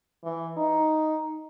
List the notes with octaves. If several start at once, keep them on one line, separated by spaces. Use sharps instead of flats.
E3
D#4